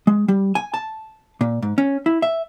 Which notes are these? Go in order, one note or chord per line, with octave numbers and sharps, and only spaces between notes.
G#3
G3
G#5
A5
A#2
G#2
C#4
E4
E5